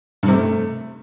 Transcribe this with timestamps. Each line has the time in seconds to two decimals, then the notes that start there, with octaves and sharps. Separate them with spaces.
0.23 G2
0.28 C3
0.33 A3